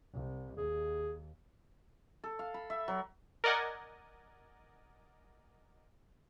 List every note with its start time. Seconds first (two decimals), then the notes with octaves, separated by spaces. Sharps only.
0.13 C2
0.58 D#2 G#4
2.24 A4
2.39 F5
2.54 B5
2.70 E5
2.88 F#3
3.44 A#4 D5 D#5 F#5 G#5